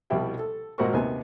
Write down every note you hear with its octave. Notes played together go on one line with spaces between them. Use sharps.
C2 B2 F3 G3 E4 G5
A4
G#1 A#2 F#4 A#4 C5 C#6
D#2 C3 D#3 B3 G#5